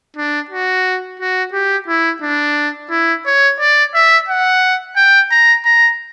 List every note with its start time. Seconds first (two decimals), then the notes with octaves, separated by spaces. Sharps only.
0.17 D4
0.50 F#4
1.20 F#4
1.53 G4
1.88 E4
2.22 D4
2.90 E4
3.26 C#5
3.60 D5
3.94 E5
4.29 F#5
4.97 G5
5.31 A#5
5.66 A#5